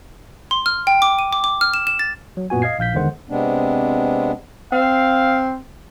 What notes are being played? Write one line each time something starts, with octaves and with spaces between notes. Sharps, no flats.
C6
F6
G5
D6
D#7
D6
D6
F6
E7
E7
A6
F#3
F#2 A#2 B3 F#4 G#5
D#5 F5 G#6 C7
A#1 F5 G6 B6
E2 D3 D#3 G#3 C5 F#5
C3 G#3 B3 C4 D4
C4 F5